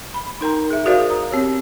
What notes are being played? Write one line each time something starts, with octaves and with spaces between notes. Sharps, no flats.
B5
D#4 A#4 G5 A#5
G#4 E5
F#4 G#4 A#4 C5 D5 F5
A#5 D#6
C4 G4 C#5